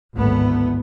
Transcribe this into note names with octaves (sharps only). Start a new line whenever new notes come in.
G#1 D2 A2 A3 B3